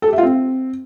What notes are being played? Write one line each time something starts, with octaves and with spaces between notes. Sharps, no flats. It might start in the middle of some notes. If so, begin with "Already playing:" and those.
A4
G4
E5
F4
C4